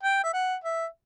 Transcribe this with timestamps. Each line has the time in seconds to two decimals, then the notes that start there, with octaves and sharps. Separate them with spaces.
0.03 G5
0.24 E5
0.34 F#5
0.64 E5